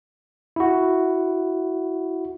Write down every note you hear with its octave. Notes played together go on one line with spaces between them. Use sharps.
E4 F#4